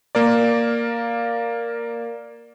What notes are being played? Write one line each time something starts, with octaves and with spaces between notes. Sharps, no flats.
A#3 A#4 D5